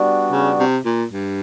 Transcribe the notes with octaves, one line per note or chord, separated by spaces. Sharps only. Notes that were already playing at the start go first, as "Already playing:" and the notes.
Already playing: G3 B3 D4 F#4
C#3
C3
A#2
G2